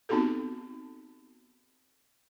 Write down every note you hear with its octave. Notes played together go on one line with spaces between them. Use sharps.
B3 C4 D#4 F#4 G4 A4